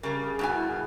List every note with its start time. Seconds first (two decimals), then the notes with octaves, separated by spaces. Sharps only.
0.03 C#3 G3 A#4
0.24 G#4
0.39 G2 B2 G#5
0.54 E4
0.70 G#4